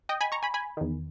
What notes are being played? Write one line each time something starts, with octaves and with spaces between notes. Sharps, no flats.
D#5 G5
G#5 B5
A#5 C#6
G#5 B5
G#5 B5
E2 D#3